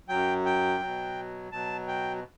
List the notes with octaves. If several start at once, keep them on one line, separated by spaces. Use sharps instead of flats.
F#2 F#3 G5
G5
B2 F#3
B2 F#3 A5
G5